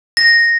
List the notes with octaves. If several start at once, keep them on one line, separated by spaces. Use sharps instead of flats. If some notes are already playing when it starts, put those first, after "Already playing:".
A#6